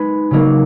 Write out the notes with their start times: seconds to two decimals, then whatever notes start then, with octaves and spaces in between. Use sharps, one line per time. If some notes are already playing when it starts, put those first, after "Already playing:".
Already playing: G#3 D#4 G#4 B4
0.31 C#3 F#3 A#3 D#4